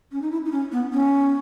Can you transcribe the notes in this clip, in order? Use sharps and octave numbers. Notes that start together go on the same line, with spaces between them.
C#4
D#4
E4
D#4
C#4
B3
C#4